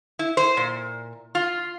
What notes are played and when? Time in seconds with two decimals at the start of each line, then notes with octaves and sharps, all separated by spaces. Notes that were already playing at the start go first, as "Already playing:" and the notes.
0.19 E4
0.37 C5
0.57 A#2
1.35 F4